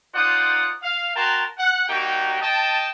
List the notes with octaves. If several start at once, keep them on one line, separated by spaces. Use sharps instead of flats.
D#4 F4 C5 D5 F#5 D#6
F5
F#4 A#4 G5 A5 A#5 C6
F#5
G3 A#3 D#4 F#4 G4 G5
D#5 G5 A5